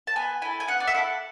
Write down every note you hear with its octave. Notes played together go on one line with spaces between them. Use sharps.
A5
B3 G#5
E4 A4 G#5
G#5
B3 F#5
D5
E5
E4 A4 F#5